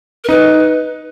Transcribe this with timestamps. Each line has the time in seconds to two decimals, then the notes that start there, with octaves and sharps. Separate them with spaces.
0.24 A#4
0.29 D#4 B4